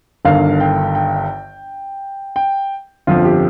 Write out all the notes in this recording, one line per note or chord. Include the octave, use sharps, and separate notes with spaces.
G1 G2 D#3 F5
G5
G5
G5
G1 F2 F3 F4
G4